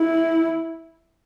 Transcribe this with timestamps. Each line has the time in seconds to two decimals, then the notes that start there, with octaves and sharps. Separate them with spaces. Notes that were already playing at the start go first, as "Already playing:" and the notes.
Already playing: E4